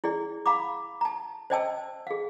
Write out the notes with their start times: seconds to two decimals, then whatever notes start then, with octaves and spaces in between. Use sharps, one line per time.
0.04 E4 G#4 D5
0.46 F5 A#5 B5 D6
1.01 A5 A#5
1.50 C5 D5 D#5 G5 A5 E6
2.07 G#4 F5